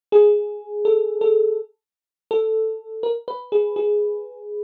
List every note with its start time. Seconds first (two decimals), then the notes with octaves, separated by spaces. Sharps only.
0.12 G#4
0.85 A4
1.21 A4
2.31 A4
3.03 A#4
3.28 B4
3.52 G#4
3.76 G#4